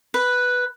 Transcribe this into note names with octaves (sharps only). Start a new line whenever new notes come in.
B4